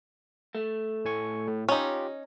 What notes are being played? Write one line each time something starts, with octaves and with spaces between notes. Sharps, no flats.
A3
A2 G#5 C#6
A2
C#4 D#4 F4 G4